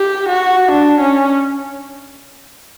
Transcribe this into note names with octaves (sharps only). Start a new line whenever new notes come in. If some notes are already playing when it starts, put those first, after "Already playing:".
Already playing: G4
F#4
D4
C#4